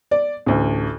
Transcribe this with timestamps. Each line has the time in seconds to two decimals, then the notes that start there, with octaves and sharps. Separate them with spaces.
0.11 D5
0.46 A1 D2